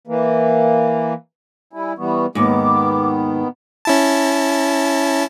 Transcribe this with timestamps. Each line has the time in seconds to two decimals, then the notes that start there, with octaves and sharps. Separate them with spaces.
0.07 E3 A#3
1.73 G3 E4 G#5
1.98 E3 G3 B3 C#6
2.35 D#2 G#2 D#3 B3 D6
3.85 C#4 E4 A5